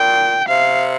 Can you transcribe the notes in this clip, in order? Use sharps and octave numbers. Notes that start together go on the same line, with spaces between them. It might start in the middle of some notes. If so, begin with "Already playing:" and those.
Already playing: A#2 G5
C3 F5